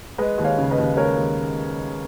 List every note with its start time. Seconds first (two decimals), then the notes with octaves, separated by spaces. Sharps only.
0.18 G#3 B4 D#5
0.38 D#2
0.44 C#5 F5
0.58 C#3
0.71 B4 D#5
0.78 D#2
0.97 G#3 A#4 C#5
1.17 D#2